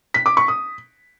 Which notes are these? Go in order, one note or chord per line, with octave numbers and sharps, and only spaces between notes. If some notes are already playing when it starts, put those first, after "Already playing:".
B6
D6
C#6
D#6